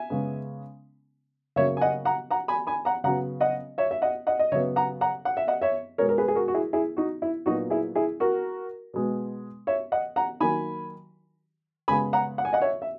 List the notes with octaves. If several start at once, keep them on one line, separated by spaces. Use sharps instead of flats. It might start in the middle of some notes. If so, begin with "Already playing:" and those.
Already playing: E5 G#5
C#3 G#3 B3
C#3 F#3 A#3 C#5 E5
G#5
D#5 F#5
F#5 A#5
F#5 A#5
G#5 B5
G#5 B5
F#5 A#5
C#3 F#3 B3 F#5 A#5
D#5 F#5
C#5 E5
E5
D#5 F#5
D#5 F#5
D#5
C#3 F#3 B3 C#5 E5
F#5 A#5
F#5 A#5
F#5
E5
D#5 F#5
C#5 E5
B2 G#3 B3 A#4 C#5
A#4
G#4 B4
G#4
F#4 A#4
F#4
E4 G#4
E4 G#4
D#4 F#4
E4
A#2 F#3 B3 D#4 F#4
E4 G#4
E4 G#4
F#4 A#4
B2 G#3 B3
C#5 E5
D#5 F#5
F#5 A#5
D#3 F#3 A#3 G#5 B5
C#3 G#3 B3 G#5 B5
F#5 A#5
F#5
G#5
D#5 F#5
C#5 E5
E5